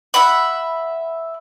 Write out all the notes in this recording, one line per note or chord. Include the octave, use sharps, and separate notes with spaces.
E5 F#5 B5